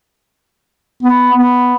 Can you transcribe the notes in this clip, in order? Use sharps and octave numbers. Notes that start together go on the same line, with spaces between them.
B3
B3